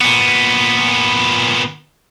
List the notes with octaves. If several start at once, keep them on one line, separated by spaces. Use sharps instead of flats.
A#2 B3